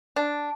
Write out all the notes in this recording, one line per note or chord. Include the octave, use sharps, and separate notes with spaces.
D4